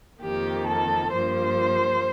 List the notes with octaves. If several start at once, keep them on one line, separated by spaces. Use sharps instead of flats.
F2 D#3 A#3 G4
A4
G2 F3 A#3 C5